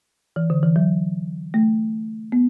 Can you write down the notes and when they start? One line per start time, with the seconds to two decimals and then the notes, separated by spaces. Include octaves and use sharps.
0.36 E3
0.50 D3
0.63 E3
0.76 F#3
1.54 A3
2.32 B3